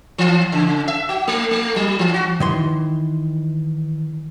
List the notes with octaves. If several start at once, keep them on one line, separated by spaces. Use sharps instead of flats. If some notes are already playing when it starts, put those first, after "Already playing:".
E3
C#3
E5
F#4
A3
A3
F#3
E3
F#4
D#3 E3 C6